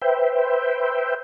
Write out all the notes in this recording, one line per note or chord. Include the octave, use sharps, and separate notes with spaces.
B4 C5 E5 G5